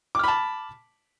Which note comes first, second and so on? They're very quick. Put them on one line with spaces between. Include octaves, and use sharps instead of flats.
D6 F6 B5 A5